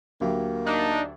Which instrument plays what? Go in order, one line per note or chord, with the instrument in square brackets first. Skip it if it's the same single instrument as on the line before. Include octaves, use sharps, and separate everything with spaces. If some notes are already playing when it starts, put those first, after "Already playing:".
[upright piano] D2 F#3 G4 [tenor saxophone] A#3
[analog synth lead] D4 [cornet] D#4